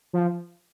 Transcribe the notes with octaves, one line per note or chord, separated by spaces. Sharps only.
F3